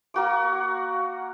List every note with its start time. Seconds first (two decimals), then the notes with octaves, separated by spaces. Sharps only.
0.14 A#3 F#4 D6